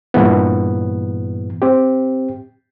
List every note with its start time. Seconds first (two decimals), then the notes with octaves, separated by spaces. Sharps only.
0.14 G2 A#2 E3 B3
1.62 C4 G4